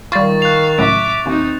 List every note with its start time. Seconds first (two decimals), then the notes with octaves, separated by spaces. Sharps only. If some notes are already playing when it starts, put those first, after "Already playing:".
0.12 D#3 G3 F4 C#6 A6
0.42 F5 F#6 F7
0.78 C#2 F#2 A2 E5 D6
1.26 D#2 C4 D#4